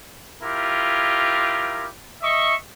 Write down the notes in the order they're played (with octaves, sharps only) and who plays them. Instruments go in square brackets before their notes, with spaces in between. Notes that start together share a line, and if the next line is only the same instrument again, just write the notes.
[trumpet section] E4 F4 G4 A#4
D#5 E5 C#6